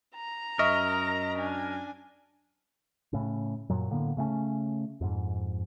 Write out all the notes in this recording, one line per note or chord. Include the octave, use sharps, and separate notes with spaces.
A#5
F#2 A#4 D#5 E5 C#6
D4 G#5
A2 C#3
F#2 A#2 F#3
A2 D3 A#3 B3
C#3 A3 B3 C#4
F2 G#2